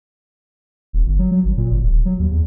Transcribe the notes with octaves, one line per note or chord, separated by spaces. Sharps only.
D#1
G1
F#3
F#3
G#1
A#2
G1
D1
F#3
D#2
E2